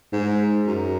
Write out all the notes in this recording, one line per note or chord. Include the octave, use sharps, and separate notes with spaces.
G#2
F#2